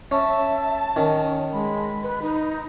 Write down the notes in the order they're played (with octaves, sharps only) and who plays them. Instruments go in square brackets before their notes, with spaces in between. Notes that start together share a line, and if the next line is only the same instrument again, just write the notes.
[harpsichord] C#4 [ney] E5 [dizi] A5
[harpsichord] D#3 [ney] C#4
[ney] G#3 [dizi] B5
[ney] B4
D#4